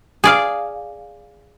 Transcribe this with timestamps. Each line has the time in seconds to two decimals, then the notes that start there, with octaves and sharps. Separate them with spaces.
0.24 G#4 D5 F5